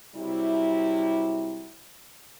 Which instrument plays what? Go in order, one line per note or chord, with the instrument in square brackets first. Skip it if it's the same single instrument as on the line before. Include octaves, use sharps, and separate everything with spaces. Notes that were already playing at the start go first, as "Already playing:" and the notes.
[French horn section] C3 F#3 G3 E4